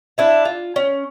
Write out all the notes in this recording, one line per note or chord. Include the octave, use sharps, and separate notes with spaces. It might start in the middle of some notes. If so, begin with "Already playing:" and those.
D4 E4 E5
F4
C#4